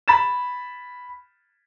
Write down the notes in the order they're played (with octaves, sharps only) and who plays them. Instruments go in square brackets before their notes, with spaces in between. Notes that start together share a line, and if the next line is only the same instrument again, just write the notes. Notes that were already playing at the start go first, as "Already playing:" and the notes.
[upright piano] B5 A6 E7